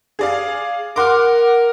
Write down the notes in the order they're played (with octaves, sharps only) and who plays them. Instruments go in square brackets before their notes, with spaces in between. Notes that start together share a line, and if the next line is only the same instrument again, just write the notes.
[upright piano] G#4 D5 F5
[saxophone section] A#4 [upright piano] F#5 C6 D6